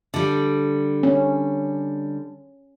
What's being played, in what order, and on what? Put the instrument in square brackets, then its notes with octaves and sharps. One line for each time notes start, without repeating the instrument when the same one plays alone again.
[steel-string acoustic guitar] D3 G3
[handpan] C#4